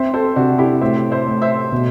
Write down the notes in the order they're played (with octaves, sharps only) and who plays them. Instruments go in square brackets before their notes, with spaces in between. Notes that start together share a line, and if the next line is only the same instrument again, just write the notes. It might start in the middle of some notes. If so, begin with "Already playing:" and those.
Already playing: [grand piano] C4 [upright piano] C5 E5
[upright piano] A4 C5
[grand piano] C3 [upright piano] D4 F#4
[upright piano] E4 G4
[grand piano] A2 [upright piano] C5 E5
[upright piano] C5 E5
[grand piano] A2
[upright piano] C5 E5
[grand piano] B2